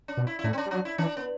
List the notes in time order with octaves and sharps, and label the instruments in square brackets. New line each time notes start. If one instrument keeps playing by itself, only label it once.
[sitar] D4
[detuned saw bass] B2
[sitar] E4
E4
[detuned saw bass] A2 [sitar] D4
[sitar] C4
D4
[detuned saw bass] G3
[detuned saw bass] F#3 [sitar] D4
[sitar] E4
[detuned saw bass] E3 [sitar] D4
[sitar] B3